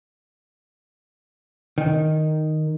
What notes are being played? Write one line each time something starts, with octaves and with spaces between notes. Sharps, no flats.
D#3